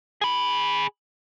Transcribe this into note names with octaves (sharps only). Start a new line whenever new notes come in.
G#4 B5